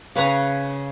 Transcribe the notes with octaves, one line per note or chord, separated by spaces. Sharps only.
C#3 B4 C#5 A#5